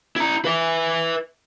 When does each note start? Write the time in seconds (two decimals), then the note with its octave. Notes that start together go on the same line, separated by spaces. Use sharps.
0.16 E4 A#5
0.45 B4 E5